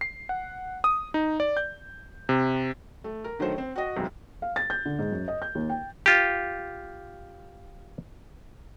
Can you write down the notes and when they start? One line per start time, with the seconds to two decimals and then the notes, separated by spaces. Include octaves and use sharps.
0.01 C7
0.29 F#5
0.84 D#6
1.14 D#4
1.40 D5
1.57 G6
2.29 C3
3.04 A3
3.24 A#4
3.39 D3 D#3 F#3 A3 C5
3.58 C4
3.76 F#4 D#5
3.96 E1 B1 C3
4.42 F5
4.56 A6
4.70 G6
4.86 D3
4.99 G#2
5.12 F#2
5.28 D#5
5.42 G6
5.55 D#2
5.70 G5
6.06 F4 G4